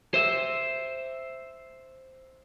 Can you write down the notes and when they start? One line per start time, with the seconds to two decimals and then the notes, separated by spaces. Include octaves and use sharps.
0.14 C5 E5